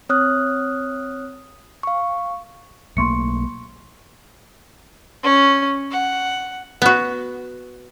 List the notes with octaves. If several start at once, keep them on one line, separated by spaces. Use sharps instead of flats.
C4 C#5 D#6 F6 F#6
F5 C#6
B1 A3 A#3 C6 C#6 C#7
C#4
F#5
B3 F#4